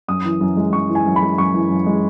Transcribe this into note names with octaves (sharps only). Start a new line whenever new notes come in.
F#2 D#6
E3
F#2
G#3
F#2 C#6
E3
G#5
F#2
B5
G#3
F#2 C#6
E3
F#2
G#3